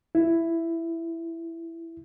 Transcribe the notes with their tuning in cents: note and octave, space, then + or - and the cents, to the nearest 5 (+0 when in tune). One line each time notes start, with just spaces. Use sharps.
E4 +10